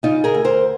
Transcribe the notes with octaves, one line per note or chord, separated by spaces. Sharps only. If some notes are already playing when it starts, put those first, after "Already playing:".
C#3 D#4 F4
G#4 A#4
D2
A#4 C5